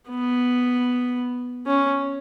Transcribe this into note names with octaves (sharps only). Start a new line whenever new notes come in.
B3
C#4